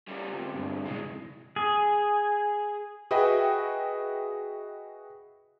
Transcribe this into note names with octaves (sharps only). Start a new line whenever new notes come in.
C#3 G3
D2 C3 F4
G2 G3
F1 E3 G#3 C7
G#4
F#4 G#4 B4 D#5 E5 G5